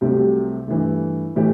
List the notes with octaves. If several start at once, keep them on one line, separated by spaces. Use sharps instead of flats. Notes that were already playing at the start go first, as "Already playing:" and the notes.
C2 C3 F#3 A3 G4
G2 E3 A3
A2 E3 A3 G4